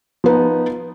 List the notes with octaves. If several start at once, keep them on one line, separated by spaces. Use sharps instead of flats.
F3 B3 D#4